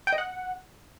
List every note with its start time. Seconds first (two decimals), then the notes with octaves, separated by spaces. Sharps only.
0.07 G5
0.13 D#5
0.18 F#5